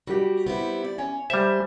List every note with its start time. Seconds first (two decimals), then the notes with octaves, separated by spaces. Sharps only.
0.07 G3 F#4 G4 G5
0.46 B3 C4 E4
0.84 D5
0.98 C#4 C#5 G#5
1.30 G3 C5 E5